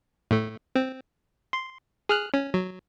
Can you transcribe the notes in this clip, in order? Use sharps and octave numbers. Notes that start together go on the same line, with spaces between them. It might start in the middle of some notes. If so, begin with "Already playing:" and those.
A2 A3
C4
C6
G#4 F6 F#6
C#4
F#3